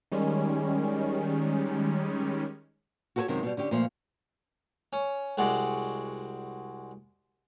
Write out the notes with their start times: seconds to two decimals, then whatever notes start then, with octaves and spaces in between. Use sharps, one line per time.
0.12 D#3 G3 G#3 C#4
3.16 F#4 G4 A4 B4 C#5
3.28 F#2 C3 D#3 G#3 C4
3.43 B2 G3
3.57 D3 C#4 G4
3.71 A#2 F3 A3
4.93 C#4
5.38 C2 G#3 F#4 D5